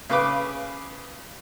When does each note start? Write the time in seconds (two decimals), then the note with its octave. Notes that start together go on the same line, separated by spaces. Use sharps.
0.10 C#3 B4 D6